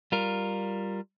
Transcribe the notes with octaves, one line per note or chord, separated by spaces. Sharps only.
G3 F4 A#4